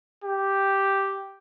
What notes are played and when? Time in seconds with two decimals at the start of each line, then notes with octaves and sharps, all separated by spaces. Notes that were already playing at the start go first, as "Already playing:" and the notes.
0.24 G4